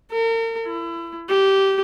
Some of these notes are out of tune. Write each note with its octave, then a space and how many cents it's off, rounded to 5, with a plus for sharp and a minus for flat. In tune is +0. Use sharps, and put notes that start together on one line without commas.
A#4 -40
E4 +30
G4 -15